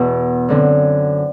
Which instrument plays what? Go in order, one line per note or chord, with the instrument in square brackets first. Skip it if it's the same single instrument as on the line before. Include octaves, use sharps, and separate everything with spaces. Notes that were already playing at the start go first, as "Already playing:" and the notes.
Already playing: [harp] E2 B2
F#2 D3 C4